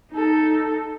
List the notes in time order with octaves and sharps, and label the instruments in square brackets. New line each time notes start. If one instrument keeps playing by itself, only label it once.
[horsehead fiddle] D#4 A4